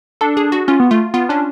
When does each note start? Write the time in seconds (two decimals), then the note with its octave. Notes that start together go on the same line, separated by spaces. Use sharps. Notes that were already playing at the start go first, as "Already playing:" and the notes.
0.21 D4 A4
0.37 G#4
0.52 F#4
0.68 C#4 F4
0.80 B3
0.91 A3 F4
1.14 B3 F4
1.29 C#4 D4